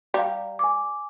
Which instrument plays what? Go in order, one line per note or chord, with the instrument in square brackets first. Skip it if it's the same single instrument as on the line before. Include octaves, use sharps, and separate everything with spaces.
[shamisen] G3 [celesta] F5 A#5
[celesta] G#5 D6